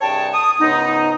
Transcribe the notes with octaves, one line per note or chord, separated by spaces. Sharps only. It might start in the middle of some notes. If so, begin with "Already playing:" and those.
C2 G2 G#4 C#5 G5 A5
D#6
C#2 G#2 C#3 B3 D#4